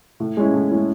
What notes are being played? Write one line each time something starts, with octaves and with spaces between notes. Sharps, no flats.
A2
G#3 C#4 E4
A2
G#3 C#4 E4